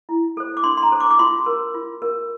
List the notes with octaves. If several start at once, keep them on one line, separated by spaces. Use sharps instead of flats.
E4
A4 C5
D6
D4 C6
C6
A#5
A4 C5
D6
D6
F4 C6
A#4
F4
A#4